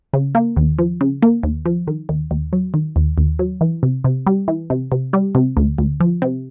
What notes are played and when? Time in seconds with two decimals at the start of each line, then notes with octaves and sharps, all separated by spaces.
0.13 C#3
0.35 A#3
0.56 D#2
0.79 F3
1.01 C#3
1.23 A#3
1.43 D#2
1.66 F3
1.87 D#3
2.09 D#2
2.31 D#2
2.53 F#3
2.74 D#3
2.96 D#2
3.18 D#2
3.39 F#3
3.61 E3
3.83 C3
4.04 C3
4.27 G3
4.48 E3
4.70 C3
4.92 C3
5.13 G3
5.35 C3
5.57 D2
5.78 D2
6.00 F3
6.22 C3